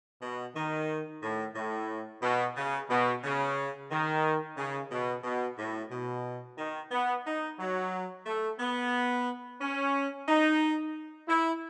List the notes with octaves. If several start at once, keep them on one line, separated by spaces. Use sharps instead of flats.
B2
D#3
A2
A2
B2
C#3
B2
C#3
D#3
C#3
B2
B2
A2
B2
D#3
B3
D#4
F#3
A3
B3
C#4
D#4
E4